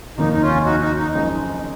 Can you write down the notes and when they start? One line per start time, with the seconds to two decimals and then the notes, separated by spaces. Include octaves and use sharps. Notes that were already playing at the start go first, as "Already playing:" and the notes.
0.17 F1 D#2 D#3 A#3 D#4
0.33 D#4
0.42 C#4 F4
0.65 D#4 F#4
0.81 D#4 F#4
0.97 D#4
1.12 F#1 F#2 F3 G#3 D#4